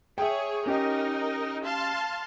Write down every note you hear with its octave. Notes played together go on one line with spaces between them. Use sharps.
G#4 C#5 E5 G5
C#4 D#4 G4 A#4 D#5
F5 A5 C6